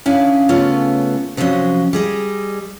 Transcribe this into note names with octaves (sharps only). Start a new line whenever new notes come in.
C#4 D4 E4 F5 G#5
C#3 A3 B3 C#4 F4
C3 F3 F#3 A3 C#4 D#5
G3 G#4 D#5